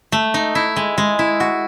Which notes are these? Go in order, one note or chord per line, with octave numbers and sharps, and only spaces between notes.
A3
D#4
E4
G#3
G#3
E4
F#4